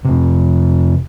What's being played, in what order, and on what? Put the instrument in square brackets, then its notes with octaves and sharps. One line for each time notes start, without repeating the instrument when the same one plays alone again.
[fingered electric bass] F2 C3